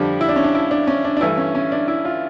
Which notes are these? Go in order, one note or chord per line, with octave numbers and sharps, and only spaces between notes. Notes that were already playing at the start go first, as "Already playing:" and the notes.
Already playing: F2 D3 G3 D4
E4
D4
C#4
D4
E4
D4
C#4
D4
D4
G2 E3 A3 E4
C#4
C#4
D4
E4
F4